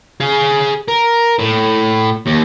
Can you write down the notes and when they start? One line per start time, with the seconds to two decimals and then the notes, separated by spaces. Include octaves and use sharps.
0.20 G#4 F5
0.88 A#4
1.39 A2
2.26 D#2